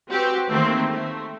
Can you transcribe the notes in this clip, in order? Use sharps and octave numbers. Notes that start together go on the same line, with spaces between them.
C4 F#4 G4 B4
D#3 E3 A3 A#3 C4
A3